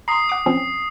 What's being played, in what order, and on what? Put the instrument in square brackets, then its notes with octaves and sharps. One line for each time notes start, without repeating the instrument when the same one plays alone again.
[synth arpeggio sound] A#5 C6 [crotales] D#6 C7
[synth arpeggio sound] F#5 D6
F3 C4 C#4